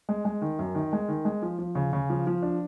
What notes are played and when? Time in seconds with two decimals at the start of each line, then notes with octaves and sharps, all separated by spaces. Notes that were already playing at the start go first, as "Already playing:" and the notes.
0.09 G#3
0.25 G#3
0.42 D#3
0.59 F#2
0.75 D#3
0.93 G#3
1.08 D#3
1.25 G#3
1.42 F3
1.58 F3
1.75 C#3
1.93 C#3
2.10 F3
2.27 F3
2.42 D4